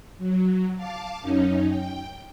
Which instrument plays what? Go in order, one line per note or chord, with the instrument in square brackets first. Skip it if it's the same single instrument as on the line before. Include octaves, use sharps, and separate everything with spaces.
[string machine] F#3
F5 A5 D6
F#2 C#4 D#4
G5